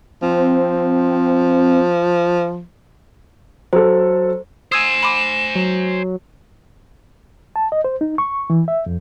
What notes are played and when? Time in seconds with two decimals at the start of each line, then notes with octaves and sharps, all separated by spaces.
0.22 F3 C4
3.73 F#3 A4 C5
4.72 C5 G#5 D#6 E6 G#6 E7
5.03 B5 C6 D6
5.55 F#3
7.56 A5
7.72 D#5
7.84 C5
8.01 D#4
8.18 C#6
8.50 E3
8.68 E5
8.86 F2